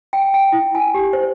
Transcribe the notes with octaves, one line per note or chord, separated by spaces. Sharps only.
G5
G5
E4
G#5
G4
C5